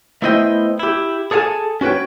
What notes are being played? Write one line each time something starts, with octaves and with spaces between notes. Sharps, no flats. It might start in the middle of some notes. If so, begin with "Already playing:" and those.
A3 B3 E4 C5 D#5 G5
E4 G4
G#4 A4 C#5 F5 G#5 A5
C#4 F#4 B4 C#5 G5